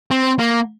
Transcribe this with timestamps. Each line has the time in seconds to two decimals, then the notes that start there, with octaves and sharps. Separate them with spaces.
0.11 C4
0.39 A#3